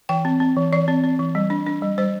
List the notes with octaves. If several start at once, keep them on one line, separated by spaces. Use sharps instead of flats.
E3 G5
C4
C4
E3
E3 D5
C4
C4
E3
G3
D4
D4
G3
G3 C5